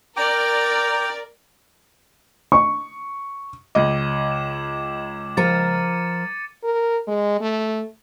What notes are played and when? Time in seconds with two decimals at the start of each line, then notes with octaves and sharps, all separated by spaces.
0.17 A#4 D5 G5 A#5 D6 D7
2.52 C#6
3.75 C#2 D#5 D6 G#6 F#7
4.32 E7
5.37 F3 A#4 A#5 A6 C#7 D#7
6.64 A#4
7.07 G#3
7.41 A3